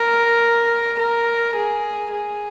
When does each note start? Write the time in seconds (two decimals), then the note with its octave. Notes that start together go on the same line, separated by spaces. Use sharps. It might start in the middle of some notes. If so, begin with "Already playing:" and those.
Already playing: A#4
0.99 A#4
1.56 G#4
2.12 G#4